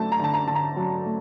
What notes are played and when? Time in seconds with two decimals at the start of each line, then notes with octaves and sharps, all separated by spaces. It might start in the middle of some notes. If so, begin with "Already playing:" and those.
Already playing: D3 F#3 A3 A5
0.12 A#5
0.20 D3 A5
0.34 A#5
0.48 D3 A5
0.55 A#5
0.76 F#3
1.05 A3